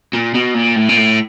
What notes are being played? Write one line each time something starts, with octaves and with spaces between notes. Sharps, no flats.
A#2
B2
A#2
A2
A#2
A2